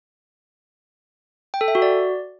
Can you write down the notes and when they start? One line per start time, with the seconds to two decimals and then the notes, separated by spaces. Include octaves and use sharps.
1.54 G5
1.61 A4
1.68 E5
1.75 F#4
1.82 D5